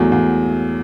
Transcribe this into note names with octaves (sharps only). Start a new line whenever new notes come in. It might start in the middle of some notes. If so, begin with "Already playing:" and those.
Already playing: E2 F#3 A3
E2